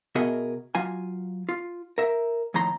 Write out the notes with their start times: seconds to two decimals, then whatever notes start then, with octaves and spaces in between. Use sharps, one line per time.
0.15 B2 F#4 G#4 A#4 D#5 E5
0.75 F#3 F4 F5 G#5
1.49 F4
1.98 A#4 E5
2.54 F2 A2 D#3 A#5 C6